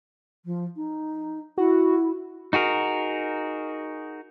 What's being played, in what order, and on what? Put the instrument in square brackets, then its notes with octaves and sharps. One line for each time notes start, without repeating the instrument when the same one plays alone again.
[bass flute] F3
D#4
[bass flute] E4 [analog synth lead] F#4
[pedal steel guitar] D#4 F#4 G#4 A#4